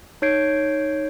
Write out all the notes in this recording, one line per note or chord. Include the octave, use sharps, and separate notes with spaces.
D#4 C#5 G6 G#6 C7 D7